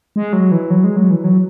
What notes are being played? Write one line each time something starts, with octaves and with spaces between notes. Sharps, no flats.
G#3
F#3
E3
F#3
G#3
F#3
E3
F#3